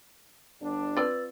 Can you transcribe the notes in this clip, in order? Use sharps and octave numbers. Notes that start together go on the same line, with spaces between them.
G1 D4
C4 F4 B4 D5 E6 A6